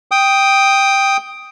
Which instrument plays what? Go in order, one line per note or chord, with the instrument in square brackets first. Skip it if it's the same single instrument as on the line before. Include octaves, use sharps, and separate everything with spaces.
[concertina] G5 D#6